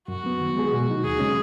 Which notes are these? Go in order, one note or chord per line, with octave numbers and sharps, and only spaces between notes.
F#2 F#4
F#3 B3
D#3
G#3 B3 G#4
B2
F#3 D#4
D#2 G#4
C#3 G#3 C#4